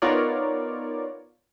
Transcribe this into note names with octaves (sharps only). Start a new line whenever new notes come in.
B3 D#4 F4 A#4 C#5 D5